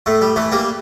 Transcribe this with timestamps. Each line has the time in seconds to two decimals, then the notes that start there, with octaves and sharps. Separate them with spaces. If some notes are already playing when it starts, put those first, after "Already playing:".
0.06 A2 A3
0.21 G3
0.36 E3 A3
0.52 G3 A#3